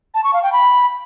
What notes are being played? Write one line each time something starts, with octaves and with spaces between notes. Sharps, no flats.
A5
C#6
F5
G5
B5